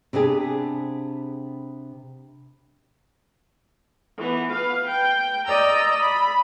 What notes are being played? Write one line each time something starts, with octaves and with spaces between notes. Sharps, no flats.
C3 B3 D4 G4 G#4
E3 B3
B4 F5
G5
D5 D#5 A#5 E6
B5